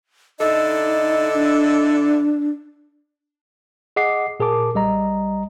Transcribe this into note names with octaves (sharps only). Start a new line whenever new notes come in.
D3 D#4 E4 A4 D#5
D4
G#4 D#5 F#5 D6 C7
A#2 G#4 A#4 A5 D6
B1 G3 D#5 A#5